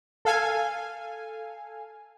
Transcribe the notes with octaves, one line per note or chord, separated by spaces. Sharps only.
A4 F5 G#5